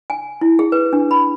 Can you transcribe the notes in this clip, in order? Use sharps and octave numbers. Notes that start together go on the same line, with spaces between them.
G#5
E4
G#4
B4
D4
B5